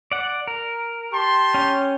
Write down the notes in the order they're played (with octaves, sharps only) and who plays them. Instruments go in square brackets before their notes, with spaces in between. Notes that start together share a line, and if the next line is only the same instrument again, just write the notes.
[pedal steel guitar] D5 F#5
A#4
[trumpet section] G4 A5 C6
[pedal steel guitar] C#4 G5